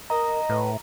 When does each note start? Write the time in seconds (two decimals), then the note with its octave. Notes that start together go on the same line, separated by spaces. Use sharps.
0.10 A#4 D#5 A#5
0.49 A2 B4